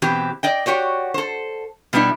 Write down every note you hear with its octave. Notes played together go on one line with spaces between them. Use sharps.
B2 E3 C4 G4
D5 D#5 G5
F#4 G4 C#5 D5
A4 C5
B2 G3 B3 D4 E4